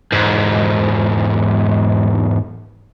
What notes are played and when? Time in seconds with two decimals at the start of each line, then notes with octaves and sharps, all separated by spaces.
0.12 E2 G#2